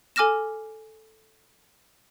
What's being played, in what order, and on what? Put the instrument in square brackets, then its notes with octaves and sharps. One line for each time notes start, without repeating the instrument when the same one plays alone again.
[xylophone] A4 G#5 D6 F6 A#6 E7